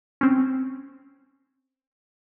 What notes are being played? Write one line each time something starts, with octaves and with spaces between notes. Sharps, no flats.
C4 C#4